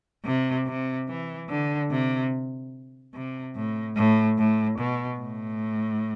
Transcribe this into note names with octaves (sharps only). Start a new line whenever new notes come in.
C3
C3
E3
D3
C3
C3
A2
A2
A2
B2
A2